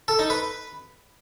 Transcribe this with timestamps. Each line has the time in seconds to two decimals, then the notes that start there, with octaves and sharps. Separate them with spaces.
0.08 A4
0.19 D#4
0.30 B4